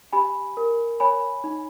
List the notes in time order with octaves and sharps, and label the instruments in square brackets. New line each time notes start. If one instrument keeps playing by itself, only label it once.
[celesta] G4 G#5 B5
A#4
C#5 G#5 B5
D#4